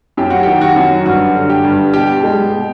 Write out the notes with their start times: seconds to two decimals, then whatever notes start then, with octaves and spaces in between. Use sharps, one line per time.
0.17 F#2 G4
0.30 F#4
0.43 D#3 G4
0.61 F#4
0.76 F#2
1.06 G2 F#4
1.35 D3
1.50 G4
1.64 G2
1.94 B2 G4
2.23 G#3
2.53 B2